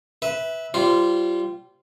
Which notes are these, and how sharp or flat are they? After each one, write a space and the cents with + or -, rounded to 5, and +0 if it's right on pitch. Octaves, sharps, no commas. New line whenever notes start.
B4 +0 E5 -15
G3 -25 F4 -20 C5 -15